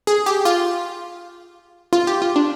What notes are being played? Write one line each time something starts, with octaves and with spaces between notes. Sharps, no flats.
G#4
G4
F4
F4
G4
F4
D4